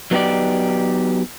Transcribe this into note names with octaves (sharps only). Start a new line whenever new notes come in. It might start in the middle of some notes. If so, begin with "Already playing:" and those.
F#3 B3 D#4 G4 D5